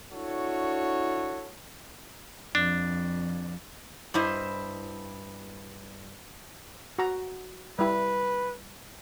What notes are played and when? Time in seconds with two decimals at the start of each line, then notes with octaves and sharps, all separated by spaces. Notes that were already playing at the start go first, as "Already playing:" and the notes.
0.13 D4 E4 F#4 A4 C#5
2.55 F2 D4
4.14 G2 E4 C5 D#5
6.98 F#4 A#5
7.79 G3 E4 B4